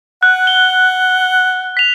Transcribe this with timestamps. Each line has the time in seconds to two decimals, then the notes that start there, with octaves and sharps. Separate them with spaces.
0.23 F#5 F#6
0.47 G7
1.77 B6 F7